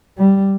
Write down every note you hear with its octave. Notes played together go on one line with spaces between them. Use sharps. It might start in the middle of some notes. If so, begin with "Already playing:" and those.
G3